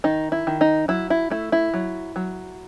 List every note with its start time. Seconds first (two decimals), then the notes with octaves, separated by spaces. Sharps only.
0.04 D#3 D#4
0.32 E4
0.47 D#3
0.61 D#4
0.88 F#3 E4
1.10 E4
1.30 A3 E4
1.52 E4
1.74 F#3
2.16 F#3